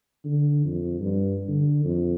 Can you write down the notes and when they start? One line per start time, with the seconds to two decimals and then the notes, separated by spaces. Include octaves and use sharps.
0.25 D3
0.65 F2
1.00 G2
1.48 D3
1.84 F2